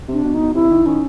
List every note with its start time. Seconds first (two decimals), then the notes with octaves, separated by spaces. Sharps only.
0.08 C3 D4
0.24 B2
0.34 B2 D#4
0.55 C3 E4
0.71 D#3
0.86 D#3 C#4